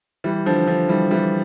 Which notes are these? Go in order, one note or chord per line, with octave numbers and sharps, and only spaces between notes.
E3 G3
D3 F3
D3 F3
E3 G3
E3 G3